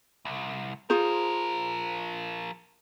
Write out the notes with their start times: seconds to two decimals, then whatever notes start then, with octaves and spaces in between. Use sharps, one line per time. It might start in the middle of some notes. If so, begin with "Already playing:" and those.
0.25 C2
0.90 F3 F4 G#4 A#4 C5